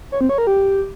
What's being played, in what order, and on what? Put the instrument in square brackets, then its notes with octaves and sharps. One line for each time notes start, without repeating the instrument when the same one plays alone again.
[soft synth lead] C#5
C4
C#5
A#4
G4